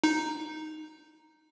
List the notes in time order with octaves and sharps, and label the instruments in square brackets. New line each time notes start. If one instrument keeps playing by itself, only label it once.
[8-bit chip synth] D#4